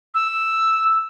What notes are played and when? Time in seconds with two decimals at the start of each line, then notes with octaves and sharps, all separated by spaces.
0.14 E6